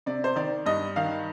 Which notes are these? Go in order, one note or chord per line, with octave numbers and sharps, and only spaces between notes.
C3 D5
C5
D#3 D5
G2 D#5
D#3 F5